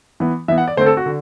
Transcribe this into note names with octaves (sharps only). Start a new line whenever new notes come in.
E3 B3
E3 B3 E5
F#5
D5
D3 A3 C4 C5
A4
F#4
D3